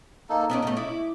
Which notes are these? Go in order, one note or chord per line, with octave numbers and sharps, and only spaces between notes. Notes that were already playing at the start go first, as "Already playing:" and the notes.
A#3 D#4 A4
B3 C#4 D5 D#5
A2 A3
E4 D6